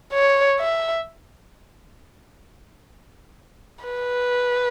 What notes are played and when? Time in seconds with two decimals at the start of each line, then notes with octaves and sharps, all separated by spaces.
0.13 C#5
0.60 E5
3.86 B4